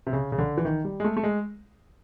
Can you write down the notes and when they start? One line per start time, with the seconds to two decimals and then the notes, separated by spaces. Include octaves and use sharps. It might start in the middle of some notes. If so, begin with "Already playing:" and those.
0.07 C3
0.13 C#3
0.32 C#3
0.38 D3
0.58 E3
0.65 D#3
0.85 G3
1.00 G#3
1.04 A3
1.16 A3
1.23 G#3